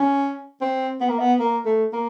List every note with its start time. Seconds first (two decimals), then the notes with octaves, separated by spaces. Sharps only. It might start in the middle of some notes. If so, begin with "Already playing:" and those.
Already playing: C#4
0.61 C4
1.01 B3
1.09 A#3
1.19 B3
1.40 A#3
1.66 A3
1.93 A#3